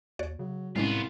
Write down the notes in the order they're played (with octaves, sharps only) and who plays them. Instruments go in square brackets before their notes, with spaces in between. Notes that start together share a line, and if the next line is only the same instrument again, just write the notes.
[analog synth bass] D#2 [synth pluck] F#4 C#5 D5
[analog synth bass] C#3 [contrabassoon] F#3
[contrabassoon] C2 [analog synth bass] A2 [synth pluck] G3 G#3 C#4 [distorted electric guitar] B3 F4